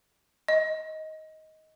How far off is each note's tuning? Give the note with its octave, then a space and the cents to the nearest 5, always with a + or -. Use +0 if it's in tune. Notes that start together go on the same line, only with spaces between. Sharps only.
D#5 +15